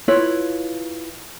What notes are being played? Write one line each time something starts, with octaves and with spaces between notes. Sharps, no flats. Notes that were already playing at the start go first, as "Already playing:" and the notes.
E4 F4 B4 C#5